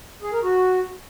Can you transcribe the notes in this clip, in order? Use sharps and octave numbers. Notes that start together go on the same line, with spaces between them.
G#4
A#4
F#4